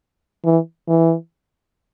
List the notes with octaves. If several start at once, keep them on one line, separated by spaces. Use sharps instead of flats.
E3
E3